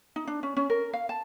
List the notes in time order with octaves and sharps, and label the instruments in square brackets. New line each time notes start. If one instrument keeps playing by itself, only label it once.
[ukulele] D#4
D4
C#4
C#4
A#4
F5
A5